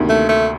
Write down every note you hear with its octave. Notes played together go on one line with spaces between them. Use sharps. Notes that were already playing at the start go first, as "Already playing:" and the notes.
Already playing: D2 C3 D#3 A#3
A3
A3